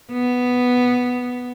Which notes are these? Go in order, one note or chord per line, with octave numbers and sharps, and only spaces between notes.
B3